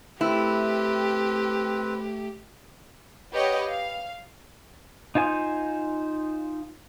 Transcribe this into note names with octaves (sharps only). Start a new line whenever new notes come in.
A3 C4 E4 G4 B4
G4 B4 C#5 D#5 F#5 G5
F5
D#4 F4 C5 G#5